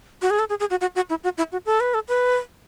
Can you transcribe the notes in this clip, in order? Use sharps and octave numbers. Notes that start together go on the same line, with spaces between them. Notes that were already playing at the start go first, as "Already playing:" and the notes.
F#4
G#4
A4
G#4
G#4
F#4
F#4
F#4
E4
F#4
E4
F#4
A4
B4
A4
B4